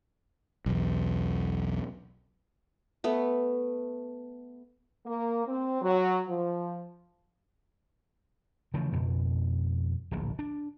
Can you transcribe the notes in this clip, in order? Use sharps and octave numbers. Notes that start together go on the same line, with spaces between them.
B1 E2
A3 B3
A#3
C4
F#3
F3
C#3 E3 F3 A3
F2 B2
D1 A#1
D4